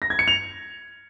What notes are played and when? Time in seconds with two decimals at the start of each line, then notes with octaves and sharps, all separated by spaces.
0.02 A#6
0.10 G#6
0.19 C#7
0.28 F7